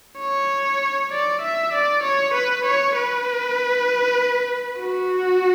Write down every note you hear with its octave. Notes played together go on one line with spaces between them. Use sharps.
C#5
D5
E5
D5
C#5
B4
C#5
B4
F#4